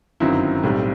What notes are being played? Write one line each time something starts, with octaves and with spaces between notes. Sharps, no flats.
G1 F#2 D#3 F#3 C4 E4
B1 A2 G3 C4